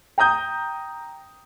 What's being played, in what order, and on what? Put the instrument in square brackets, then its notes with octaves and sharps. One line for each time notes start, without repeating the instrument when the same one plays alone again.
[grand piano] G5 A#5 D#6 G6